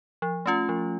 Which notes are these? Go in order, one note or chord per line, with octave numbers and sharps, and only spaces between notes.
F3
A3 C#4 F4
F3